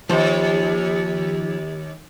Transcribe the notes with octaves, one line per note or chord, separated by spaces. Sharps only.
D#2 F3 G4 C5